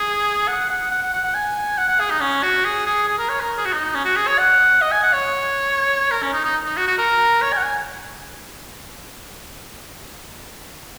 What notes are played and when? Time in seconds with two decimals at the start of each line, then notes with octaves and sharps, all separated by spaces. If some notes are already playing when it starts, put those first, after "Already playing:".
Already playing: G#4
0.48 F#5
0.70 F#5
0.91 F#5
1.02 F#5
1.13 F#5
1.24 F#5
1.34 G#5
1.78 F#5
1.89 F#5
2.00 G#4
2.10 D#4
2.21 C#4
2.43 F#4
2.65 G#4
2.86 G#4
3.08 G#4
3.19 A#4
3.29 C#5
3.40 A#4
3.57 G#4
3.65 F#4
3.73 D#4
3.95 C#4
4.05 F#4
4.16 G#4
4.27 C#5
4.39 F#5
4.81 D#5
4.92 G#5
5.03 F#5
5.13 C#5
6.11 A#4
6.22 C#4
6.33 D#4
6.44 D#4
6.65 D#4
6.77 F#4
6.87 F#4
6.98 A#4
7.42 C#5
7.53 G#5
7.58 F#5
7.63 G#5